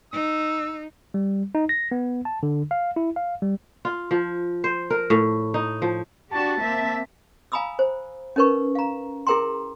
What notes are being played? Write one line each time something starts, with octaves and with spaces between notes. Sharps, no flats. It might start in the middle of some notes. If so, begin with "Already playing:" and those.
D#4 E6
G3
D#4
A#6
B3
A5
D3
F5
E4
F5
G3
F4
F3
C5
A#4
A2
D#4
F3
D4 F#4 G4 A5
A#3 C4 E5
F5 G#5 A#5 B5 D#6 E6
C5
C#4 D#4 A#4 B4 C#6
F5 A#5
E4 G#4 A#4 G5 A#5 C6